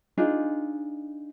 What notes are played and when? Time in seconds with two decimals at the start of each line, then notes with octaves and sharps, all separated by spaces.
0.18 D4 D#4 F4 G#4